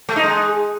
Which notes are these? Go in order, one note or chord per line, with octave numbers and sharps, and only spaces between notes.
A3
D#4
G#3